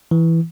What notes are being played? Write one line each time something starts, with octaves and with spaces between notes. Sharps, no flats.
E3